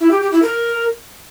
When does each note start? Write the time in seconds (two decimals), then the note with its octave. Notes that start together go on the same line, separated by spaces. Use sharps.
0.01 E4
0.11 G4
0.21 G4
0.32 E4
0.42 A#4